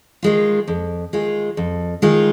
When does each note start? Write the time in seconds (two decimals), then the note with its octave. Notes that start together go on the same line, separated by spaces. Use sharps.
0.23 D#3 G#3 F4
0.68 F2
1.13 D#3 G#3 F4
1.57 F2
2.02 D#3 G#3 F4